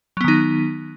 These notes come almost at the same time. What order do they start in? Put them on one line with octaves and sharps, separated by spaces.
F#3 B3 D#3 D#4